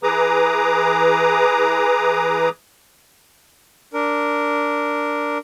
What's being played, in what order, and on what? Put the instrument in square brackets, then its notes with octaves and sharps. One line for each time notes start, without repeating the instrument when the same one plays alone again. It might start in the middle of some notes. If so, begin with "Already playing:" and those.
[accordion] E3 G#4 B4 A#5 D6 D#6
[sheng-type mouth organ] D4 A#4